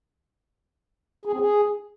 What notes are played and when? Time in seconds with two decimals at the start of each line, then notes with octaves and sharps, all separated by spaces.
1.25 G#4
1.33 C4
1.40 G#4